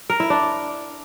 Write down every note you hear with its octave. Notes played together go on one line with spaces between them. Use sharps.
A#4
E4
D4